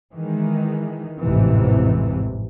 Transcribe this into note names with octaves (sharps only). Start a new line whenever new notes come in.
D#3 E3 G#3
A1 F2 G#2 C3 E3